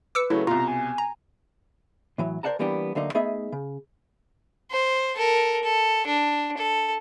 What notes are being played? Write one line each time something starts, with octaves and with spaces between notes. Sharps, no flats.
B4 D6 E6 C#7
C#3 F#3 A3 E4
C2 B2 F4 A#5
G#5
A#5
A2 E3 F#3
A#4 C5 D5 F#5 A5 A#5
E3 G3 A#3 B3 D4 G4
D2 D3 F#3 A#3 D#4
A3 B3 D#4 G#4 D#5 E5
C#3
C5
A4 A#4
A4
D4
A4